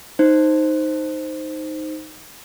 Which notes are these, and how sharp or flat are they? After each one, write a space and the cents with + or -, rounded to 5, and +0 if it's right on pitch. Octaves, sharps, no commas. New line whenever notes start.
D#4 +0 C5 +0